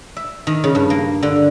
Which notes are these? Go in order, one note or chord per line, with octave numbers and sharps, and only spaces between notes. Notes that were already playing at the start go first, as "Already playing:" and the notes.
E5
D#3
C#3
G2
A#3
D3